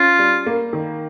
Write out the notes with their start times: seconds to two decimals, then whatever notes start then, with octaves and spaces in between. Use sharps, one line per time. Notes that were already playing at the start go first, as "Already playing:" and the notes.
Already playing: C#4 F4
0.19 G3
0.46 A#3
0.73 D#3